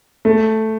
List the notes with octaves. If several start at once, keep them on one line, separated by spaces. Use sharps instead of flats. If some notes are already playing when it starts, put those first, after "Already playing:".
A3